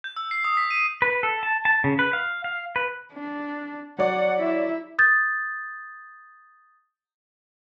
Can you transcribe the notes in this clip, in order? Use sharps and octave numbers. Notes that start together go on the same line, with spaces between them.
G6
E6
C7
D#6
B6
D#7
B4
A4
A5
A5
C#3
B4
F5
F5
B4
D4
F#3 C#5 D5 F#5
E4 E5
D#6 G6 A6